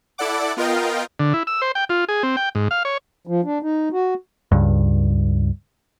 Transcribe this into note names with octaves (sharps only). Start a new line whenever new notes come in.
E4 A4 D5 F#5 D6
B3 F4 A#4 D#5 F5 G5
D3
E4
E6
C5
G5
F4
G#4
C4
G5
G#2
F5
C#5
F3
D4
D#4
F#4
C#2 G2